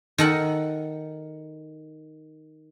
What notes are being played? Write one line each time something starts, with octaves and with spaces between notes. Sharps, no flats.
D#3 A4 F#5